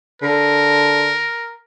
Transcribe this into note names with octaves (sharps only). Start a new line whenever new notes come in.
D3 A#4